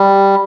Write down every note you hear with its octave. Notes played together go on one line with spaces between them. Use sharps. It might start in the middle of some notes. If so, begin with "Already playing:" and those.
Already playing: G3